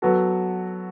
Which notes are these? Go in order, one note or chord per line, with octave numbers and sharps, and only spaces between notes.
F#3 B3 F#4 A4